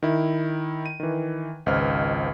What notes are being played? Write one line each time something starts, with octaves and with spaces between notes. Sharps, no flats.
D#3 E4
D#7
D#3 E3
G#1 C#2 B4 C5 D#5 F6